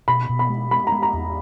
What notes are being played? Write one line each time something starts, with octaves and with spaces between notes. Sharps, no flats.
B2 B5
B2
B5
G#3
G#3 B5
A#5
G#3
A#5
E2